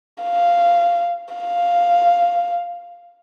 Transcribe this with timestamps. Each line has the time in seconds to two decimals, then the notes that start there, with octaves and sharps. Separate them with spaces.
0.23 F5
1.34 F5